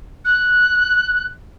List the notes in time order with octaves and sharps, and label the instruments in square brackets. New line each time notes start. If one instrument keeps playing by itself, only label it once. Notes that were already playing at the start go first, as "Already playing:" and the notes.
[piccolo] F#6